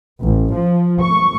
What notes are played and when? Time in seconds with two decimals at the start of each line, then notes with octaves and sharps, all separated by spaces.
0.21 A1
0.52 F3
1.01 C#6